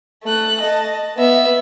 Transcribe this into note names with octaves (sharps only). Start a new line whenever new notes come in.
A3 F#6
D#5 A5
B3 E5